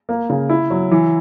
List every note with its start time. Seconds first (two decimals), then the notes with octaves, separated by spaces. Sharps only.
0.09 A#3
0.30 C#3
0.49 E4
0.70 F#3
0.91 E3